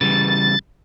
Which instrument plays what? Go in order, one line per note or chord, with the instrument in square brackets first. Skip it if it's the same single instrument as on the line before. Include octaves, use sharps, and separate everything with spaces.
[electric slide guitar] C#3 E3 G3 [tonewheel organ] A6